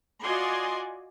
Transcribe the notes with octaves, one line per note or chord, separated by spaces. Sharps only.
F4 F#4 D5 D#5 G#5 C6